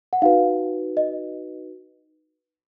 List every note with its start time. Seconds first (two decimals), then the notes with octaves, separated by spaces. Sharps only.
0.13 F#5
0.22 D#4 F#4 B4 F5
0.97 D#5